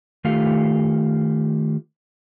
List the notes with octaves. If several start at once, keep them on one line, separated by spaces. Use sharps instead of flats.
D#3 A3 F4 G4 A4 F5